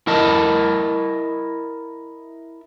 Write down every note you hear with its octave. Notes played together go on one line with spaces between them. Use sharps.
E4 A#4 D#5 A5 B5